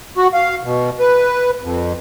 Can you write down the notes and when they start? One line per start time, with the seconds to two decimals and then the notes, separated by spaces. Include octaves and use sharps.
0.17 F#4
0.34 F5
0.63 B2
0.99 B4
1.62 F2